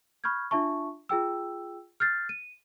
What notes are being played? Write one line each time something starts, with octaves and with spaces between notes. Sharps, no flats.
B5 C#6 F6 G6 G#6
D4 F4 E5 A5 C#6
F4 G#4 G5 E6
F6 G6 A6 C7
D#7